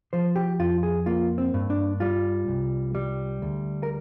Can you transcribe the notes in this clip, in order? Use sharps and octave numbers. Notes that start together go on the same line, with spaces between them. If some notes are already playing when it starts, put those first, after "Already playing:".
F3 C5
G4
F2 F4
G#4
A#3 F4
C4
G2
D4
G3 F4
C2
G3
D2
A#4